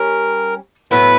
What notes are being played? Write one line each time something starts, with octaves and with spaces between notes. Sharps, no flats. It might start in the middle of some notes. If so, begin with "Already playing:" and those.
Already playing: G3 C#4 A#4
A2 F#3 B3 E4 B4